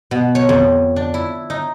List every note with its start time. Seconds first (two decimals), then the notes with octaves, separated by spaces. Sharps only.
0.11 B2
0.35 C#5
0.49 F2
0.96 D4
1.14 E4
1.50 D#4